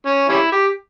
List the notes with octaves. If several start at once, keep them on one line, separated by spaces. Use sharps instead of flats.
C#4
G3 C#4 E4
G4